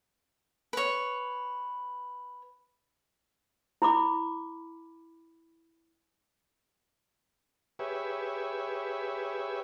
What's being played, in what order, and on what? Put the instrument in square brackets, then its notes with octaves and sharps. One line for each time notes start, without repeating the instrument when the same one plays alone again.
[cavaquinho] B4 C#5
[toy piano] E4 B5 D6
[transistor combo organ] G4 G#4 B4 C#5 E5